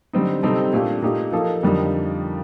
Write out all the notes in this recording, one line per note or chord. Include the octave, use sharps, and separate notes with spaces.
D3 G3 C4 D#4
C3 G3 C4 D#4 A4
A#2 A3 D4 G4
A#2 A3 D#4 G4
F3 A#3 D#4 A4
F2 D3 G3 A#3 D#4